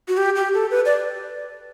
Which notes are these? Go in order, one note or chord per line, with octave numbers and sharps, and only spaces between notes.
F#4
G4
G4
A4
B4
D5